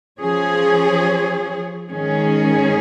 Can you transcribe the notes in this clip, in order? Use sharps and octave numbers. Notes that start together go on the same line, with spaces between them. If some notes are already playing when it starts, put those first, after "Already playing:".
F3 C#4 G#4 C#5
G#2 D#3 C#4 G#4